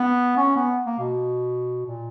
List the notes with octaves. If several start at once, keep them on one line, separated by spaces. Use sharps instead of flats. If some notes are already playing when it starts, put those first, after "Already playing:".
Already playing: B3
C#4
B3
A#3
B2
A#2